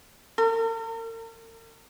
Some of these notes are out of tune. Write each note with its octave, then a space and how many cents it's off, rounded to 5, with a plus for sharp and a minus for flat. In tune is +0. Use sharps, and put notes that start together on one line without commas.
A#4 -45